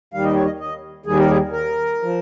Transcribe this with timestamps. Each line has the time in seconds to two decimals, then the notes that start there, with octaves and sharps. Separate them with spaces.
0.14 D#2 D#3 G3 F5
0.24 D#5
0.35 C#5
0.45 D#5
0.60 D#5
1.06 D#2 D#3 G3 G#4
1.19 A#4
1.30 G#4
1.52 A#4
2.03 F3